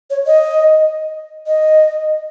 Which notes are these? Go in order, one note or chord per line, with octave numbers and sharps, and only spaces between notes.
C#5
D#5
D#5